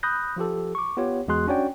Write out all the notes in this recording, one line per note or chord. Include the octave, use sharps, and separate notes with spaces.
B5 D#6 F#6 G6 A#6
F3 F4 G4 A4
C#6 D6
B3 F4 G4 C#5
E2 G#3 F#4 G#4 C6 F#6
C#4 D4 F#4 C#5 D5 G5